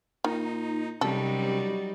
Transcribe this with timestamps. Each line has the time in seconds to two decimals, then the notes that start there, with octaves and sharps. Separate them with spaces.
0.24 A#2 D#3 D#4
1.01 F#2 C3 F#3 G3 D#4 A4